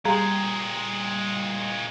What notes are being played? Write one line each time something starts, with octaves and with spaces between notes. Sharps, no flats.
A#2 G3 G#3 G#4 F5 G5 A#5 C6